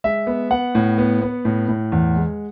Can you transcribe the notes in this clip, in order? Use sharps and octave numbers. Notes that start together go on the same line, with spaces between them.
G#3 E5
B3
B3 F#5
A2
B3
B3
A2
A2
E2
G#3